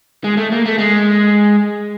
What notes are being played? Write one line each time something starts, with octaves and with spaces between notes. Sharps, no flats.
G#3
A3
A#3
A3
G#3